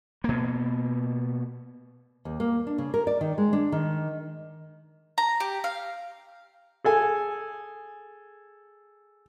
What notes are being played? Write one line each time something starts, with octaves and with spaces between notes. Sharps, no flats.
B2 A#3
D#2
A#3
D4
C#3
A#4
D5
D#3
G#3
D4
D#3
A#5
G4
F5
G#4 A4 G#5